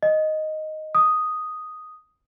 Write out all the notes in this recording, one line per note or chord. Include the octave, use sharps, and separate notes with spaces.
D#5
D#6